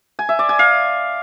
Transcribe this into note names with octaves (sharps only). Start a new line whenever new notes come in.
G#5
E5
D5
G#5
F5